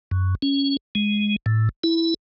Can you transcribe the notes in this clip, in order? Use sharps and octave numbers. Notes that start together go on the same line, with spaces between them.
F#2
C#4
G#3
A2
E4